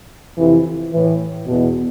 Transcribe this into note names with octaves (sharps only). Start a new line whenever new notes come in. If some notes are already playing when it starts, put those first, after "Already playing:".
F2 C3 E3
A2 E3
E2 B2